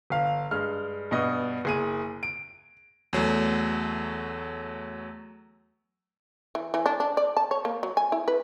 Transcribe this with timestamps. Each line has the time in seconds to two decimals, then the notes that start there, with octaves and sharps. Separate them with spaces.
0.10 G1 F5
0.51 G2 G#3 F6
1.11 G2 B2 D#5
1.65 F#1 G#4 D#7
2.23 D7
3.13 E2 F#3 A3
6.55 E3
6.74 E3
6.86 D4
7.00 D4
7.17 D5
7.37 A5
7.51 C#5
7.65 A#3
7.83 F#3
7.97 G#5
8.12 E4
8.28 B4